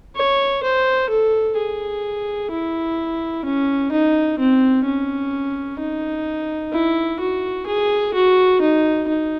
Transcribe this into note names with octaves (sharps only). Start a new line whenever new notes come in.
C#5
C5
A4
G#4
E4
C#4
D#4
C4
C#4
D#4
E4
F#4
G#4
F#4
D#4
D#4